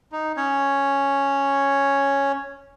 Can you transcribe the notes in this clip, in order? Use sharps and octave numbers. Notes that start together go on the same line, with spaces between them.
D#4
C#4 C#5